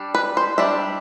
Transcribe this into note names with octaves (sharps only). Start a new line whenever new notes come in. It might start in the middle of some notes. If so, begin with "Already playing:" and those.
Already playing: G3 D4
B4
C5
G3 D4 E5